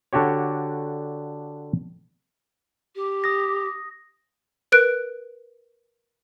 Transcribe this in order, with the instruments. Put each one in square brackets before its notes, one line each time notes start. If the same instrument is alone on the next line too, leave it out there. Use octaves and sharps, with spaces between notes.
[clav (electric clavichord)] D3 D4 F#4 G4 C#5
[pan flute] G4
[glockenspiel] D#6 A#6
[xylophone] A#4 B4 F#6 D7